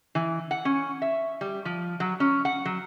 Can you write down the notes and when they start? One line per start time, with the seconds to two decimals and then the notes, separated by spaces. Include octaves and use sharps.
0.15 E3
0.51 F#5
0.65 C#4
1.02 E5
1.41 G3
1.65 F3
2.00 F#3
2.20 C#4
2.45 F#5
2.65 F#3